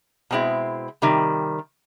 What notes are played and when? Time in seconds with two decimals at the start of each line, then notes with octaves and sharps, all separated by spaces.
0.31 B2 G#3 C4 E4
1.02 C3 D#3 G3